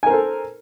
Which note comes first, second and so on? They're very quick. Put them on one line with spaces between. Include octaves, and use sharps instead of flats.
G#5 A#4 C5 A4